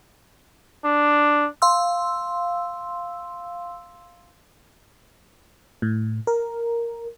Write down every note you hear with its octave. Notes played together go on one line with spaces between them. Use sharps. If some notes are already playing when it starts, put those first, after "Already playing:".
D4
F5 C6 E6
A2
A#4